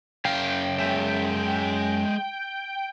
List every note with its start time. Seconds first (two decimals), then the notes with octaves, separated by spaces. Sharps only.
0.25 F#2 F5 G5
0.79 G#3 E5